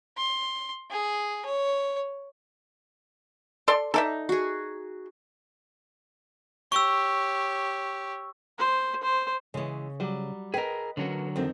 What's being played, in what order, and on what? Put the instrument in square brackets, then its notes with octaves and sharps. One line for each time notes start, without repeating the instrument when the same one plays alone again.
[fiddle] C6
G#4
C#5
[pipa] A4 D5 C6
[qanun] D#4 [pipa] A4 D5 E5
[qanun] F#4 G#4
[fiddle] G4 C#5 [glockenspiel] C#6 E6
[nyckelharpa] C5
C5
[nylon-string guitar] C#3 C#5 [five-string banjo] E3 G#3
[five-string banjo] F#3 G3
[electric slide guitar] G#4 A#4 [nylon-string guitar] B4 D#5 [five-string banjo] G5
[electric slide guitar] D3 F#3 F#4 [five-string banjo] C#4 A#4
[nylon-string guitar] F2 D#3 C4 [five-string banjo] A3